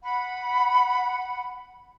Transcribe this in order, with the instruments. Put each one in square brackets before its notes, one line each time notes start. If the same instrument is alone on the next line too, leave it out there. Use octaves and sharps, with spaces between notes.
[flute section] F#5 B5